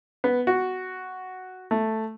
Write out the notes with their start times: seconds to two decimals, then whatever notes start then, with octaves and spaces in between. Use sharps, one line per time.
0.24 B3
0.47 F#4
1.71 A3